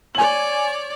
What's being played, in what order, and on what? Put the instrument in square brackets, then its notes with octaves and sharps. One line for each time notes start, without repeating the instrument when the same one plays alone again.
[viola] C#5 D5 [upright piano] G#5 F#7